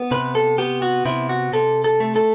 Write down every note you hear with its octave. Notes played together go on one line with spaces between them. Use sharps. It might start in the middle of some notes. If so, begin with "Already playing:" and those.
Already playing: B3
C3 B4
A4
B3 G4
F#4
C3 E4
F#4
C3 A4
A4
A3
A4